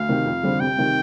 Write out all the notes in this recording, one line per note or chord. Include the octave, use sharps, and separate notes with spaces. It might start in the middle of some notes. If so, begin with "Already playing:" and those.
Already playing: D2 F5
C3 D#3
F2
D3 G3 C4 G4
C2 G5
C3 D#3